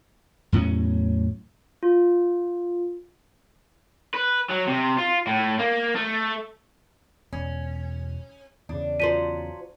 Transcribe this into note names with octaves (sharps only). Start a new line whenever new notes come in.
E2 A2 F#3 C#4
F4
B4
F#3
C3
F4
A2
A#3
A3
E1 C#4
E2 C#3 D4
F3 F#3 C5 D5 B6 D#7